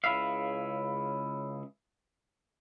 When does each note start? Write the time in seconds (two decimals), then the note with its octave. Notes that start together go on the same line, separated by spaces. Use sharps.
0.04 C#2 C#3 E4 E5 F5